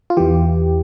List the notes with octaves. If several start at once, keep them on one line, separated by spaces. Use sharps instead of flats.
F4
E2 E3 G4